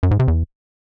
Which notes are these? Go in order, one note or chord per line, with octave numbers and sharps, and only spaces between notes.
F#2
G#2
C3
E2